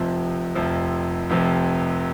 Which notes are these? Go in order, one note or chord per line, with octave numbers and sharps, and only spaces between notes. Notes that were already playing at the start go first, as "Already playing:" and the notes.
Already playing: F1 F2 C3 F3
F1 F2 C3 F3
F1 F2 C3 F3